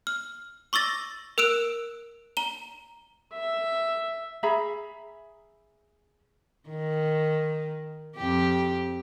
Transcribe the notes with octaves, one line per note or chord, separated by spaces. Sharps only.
F6
C#6 D6 E6 A6 A#6
A#4 E6 F#6 D7 E7
A#5 G7
E5
G#4 E5 A#5 B5
D#3
F2 G4